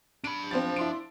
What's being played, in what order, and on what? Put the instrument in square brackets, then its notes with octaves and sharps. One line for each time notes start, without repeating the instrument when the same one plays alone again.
[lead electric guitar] D4 B5 [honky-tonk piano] D7
[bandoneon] F3 [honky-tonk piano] C4 C5 A6
[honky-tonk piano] E4 C6 D7